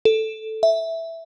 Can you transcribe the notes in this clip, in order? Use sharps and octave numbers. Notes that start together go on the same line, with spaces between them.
A4
E5